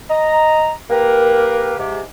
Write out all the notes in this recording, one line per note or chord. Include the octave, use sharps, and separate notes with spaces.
D#5 A#5
A#3 G4 A#4 B4
G#2 C3